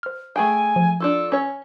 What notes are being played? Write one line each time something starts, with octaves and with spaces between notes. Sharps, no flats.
C5 F6
A3 G#4 G5 G#5
F3
D4 F4 A4 E6
C#4 C#5